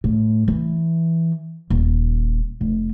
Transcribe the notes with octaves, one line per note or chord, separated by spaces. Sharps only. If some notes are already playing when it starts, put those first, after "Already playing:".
A2
E3
D#1
F1